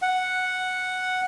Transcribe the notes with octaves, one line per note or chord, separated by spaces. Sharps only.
F#5